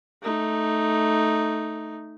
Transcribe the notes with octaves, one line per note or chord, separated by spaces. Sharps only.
A3 D#4